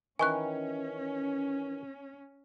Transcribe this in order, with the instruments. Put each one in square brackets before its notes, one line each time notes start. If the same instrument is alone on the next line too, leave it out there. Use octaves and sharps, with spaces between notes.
[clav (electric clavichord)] D#3 E3 [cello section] C#4 [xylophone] G#5 C#6 F#6